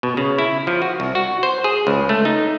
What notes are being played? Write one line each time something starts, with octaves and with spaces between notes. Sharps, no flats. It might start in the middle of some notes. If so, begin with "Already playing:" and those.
B2
C#3
E4
F3
F#4
C2
F#4
C5
G#4
C#2
A3
D#4